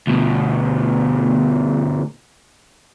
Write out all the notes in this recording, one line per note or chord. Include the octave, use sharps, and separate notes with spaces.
D2 B2